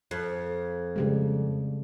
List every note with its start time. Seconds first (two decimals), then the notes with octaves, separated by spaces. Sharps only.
0.11 F2
0.96 C#3 G3 G#3